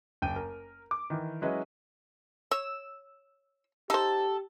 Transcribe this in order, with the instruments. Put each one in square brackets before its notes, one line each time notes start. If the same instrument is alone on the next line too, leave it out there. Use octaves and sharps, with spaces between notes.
[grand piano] F#1 G5 D#7
A#4
D6
D#3 E3
F#3 G#3 C#4 E4 B4 D#5
[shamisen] C#5 [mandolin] E6
[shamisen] D#4 C5 [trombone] G4 [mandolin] A4